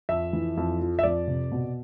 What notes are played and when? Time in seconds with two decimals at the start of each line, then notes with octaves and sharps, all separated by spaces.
0.09 F2 E5
0.33 E3
0.57 F2
0.81 F3
0.99 E5
1.03 F2 D5
1.27 C3
1.52 B2